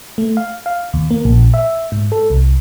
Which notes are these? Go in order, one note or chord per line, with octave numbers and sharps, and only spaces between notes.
A3
F5
F5
D#2
A#3
A#1
E5
G#2
A4
C2